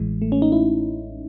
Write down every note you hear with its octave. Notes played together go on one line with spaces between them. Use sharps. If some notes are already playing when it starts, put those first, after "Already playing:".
Already playing: A1 A2 E3 G#3
A3
C#4
D#4
E4